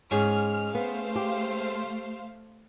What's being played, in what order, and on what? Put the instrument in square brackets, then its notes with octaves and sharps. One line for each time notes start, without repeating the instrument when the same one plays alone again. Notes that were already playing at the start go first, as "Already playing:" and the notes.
[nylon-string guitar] G#2 [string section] G#3 F6 [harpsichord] C#4 G#4
[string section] A3 C5 F5 [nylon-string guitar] B3
[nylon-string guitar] G4